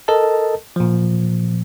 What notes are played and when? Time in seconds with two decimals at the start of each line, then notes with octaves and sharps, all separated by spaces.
0.08 A4 A#4 D#5 A5
0.76 A#2 F3